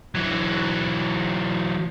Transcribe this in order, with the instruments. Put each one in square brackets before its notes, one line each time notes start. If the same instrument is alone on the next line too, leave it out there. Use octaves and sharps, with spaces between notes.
[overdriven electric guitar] E3 F#3